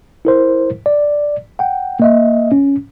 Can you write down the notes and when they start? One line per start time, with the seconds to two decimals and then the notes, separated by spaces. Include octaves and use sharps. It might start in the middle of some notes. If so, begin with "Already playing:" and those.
0.25 E4 A#4 C5
0.86 D5
1.59 F#5 G5
2.00 A#3 D#5 E5
2.52 C#4